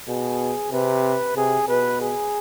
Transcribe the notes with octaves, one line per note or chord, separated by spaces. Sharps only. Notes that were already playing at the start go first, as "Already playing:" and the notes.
B2 G#4
C3 B4
C3 G#4
B2 B4
G#4